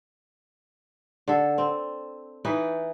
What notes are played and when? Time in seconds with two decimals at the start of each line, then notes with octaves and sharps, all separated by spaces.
1.28 D3 A4
1.58 C4
2.45 E3 D#4 B4